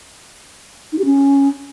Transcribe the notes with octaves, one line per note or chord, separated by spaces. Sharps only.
D#4
G4
C#4